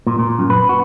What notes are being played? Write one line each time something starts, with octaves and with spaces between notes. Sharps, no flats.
A#2
A#2
F#2
B4
F#4